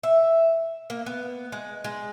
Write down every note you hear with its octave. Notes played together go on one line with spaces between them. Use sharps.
E5
A#3
B3
G#3
G#3